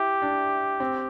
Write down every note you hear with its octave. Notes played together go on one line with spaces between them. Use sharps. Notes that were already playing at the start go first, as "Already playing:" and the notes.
Already playing: E4 G4
D4
C4